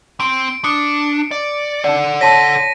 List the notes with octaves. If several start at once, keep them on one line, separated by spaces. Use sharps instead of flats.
C4 D7
D4 D#6 C#7
D5
D#4 A4 D5 F#5
C#5 A5 C6 A#6 B6 D#7